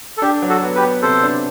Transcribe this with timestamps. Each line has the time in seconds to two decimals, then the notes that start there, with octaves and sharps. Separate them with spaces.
0.17 A4
0.22 D4 G4
0.42 F#3
0.49 F#4 A4
0.62 B3
0.75 G4 B4
0.82 B3
1.02 C3 A4 C5
1.23 D4